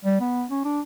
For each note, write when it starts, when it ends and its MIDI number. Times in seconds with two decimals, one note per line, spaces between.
0.04 0.18 55
0.20 0.44 59
0.50 0.62 61
0.65 0.80 62